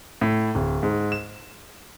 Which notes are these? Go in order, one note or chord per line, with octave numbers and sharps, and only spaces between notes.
A2
D1
G#2
E7